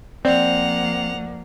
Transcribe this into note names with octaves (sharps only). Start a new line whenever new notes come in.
F3 A#3 C4 D5 F#5 F7